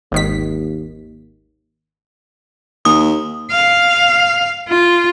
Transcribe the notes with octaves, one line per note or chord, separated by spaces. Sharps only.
G#1 D#2 D#3 B6
D#2 D#6
F5
F4